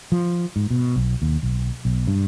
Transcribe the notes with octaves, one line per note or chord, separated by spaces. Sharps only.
F3
G#2
B2
B1
D#2
B1
B1
G2